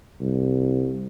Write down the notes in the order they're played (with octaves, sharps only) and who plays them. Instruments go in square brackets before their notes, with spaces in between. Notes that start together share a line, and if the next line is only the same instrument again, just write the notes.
[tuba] C2